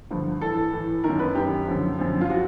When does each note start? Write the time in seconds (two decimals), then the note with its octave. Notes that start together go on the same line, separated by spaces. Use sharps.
0.11 G2 D3 F3
0.41 A2 E3 A4
0.73 A2 E3
1.04 D#3 A#4
1.09 F#2
1.19 B4
1.35 F#2 D#3 G4
1.67 F#2 D3 F3
1.99 F#2 D3 F3
2.21 F4
2.30 F3 F#4